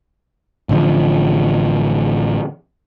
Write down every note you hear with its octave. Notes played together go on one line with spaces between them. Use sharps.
A1 D3 F3